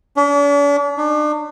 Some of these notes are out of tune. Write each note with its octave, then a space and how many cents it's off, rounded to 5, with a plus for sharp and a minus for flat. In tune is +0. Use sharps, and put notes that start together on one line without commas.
D4 -45
D4 +40